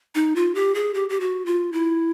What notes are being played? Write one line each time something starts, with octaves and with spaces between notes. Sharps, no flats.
D#4
F4
G4
G#4
G4
G4
F#4
F4
E4